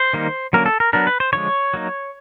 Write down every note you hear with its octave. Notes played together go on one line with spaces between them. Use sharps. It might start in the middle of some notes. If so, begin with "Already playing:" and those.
Already playing: C5
D#3 G3 A#3 D#4
D3 F#3 A#3 C#4 A#4
A4
A#4
F#3 B3 D4 A#4
B4
C5
D3 F3 G#3 C#5
F#3 A#3 D#4